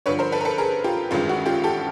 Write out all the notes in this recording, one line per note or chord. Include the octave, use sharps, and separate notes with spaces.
G2 D3 F3 B4 C#5
A#4 C5
A4 B4
A#4
A4 B4
G#4 A#4
F4 G4
A1 G2 D#3 G#3 F4
F#4
F4 G4
G4 A4